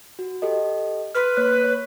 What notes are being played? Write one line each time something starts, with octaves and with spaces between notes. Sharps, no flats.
F#4
G4 A4 D#5
B4 C6 F6
A#3 C#5 F#6
C#5